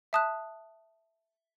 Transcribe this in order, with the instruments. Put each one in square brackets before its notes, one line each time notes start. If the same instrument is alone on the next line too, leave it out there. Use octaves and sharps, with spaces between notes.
[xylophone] E5 A5 D#6 F#6